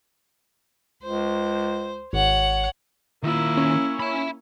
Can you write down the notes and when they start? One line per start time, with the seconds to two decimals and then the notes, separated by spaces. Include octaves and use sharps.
1.03 C#2 C5
2.13 G#1 C#5 F#5
3.23 D#3 A#3 E4 F4
3.57 C#4
4.00 E5 B5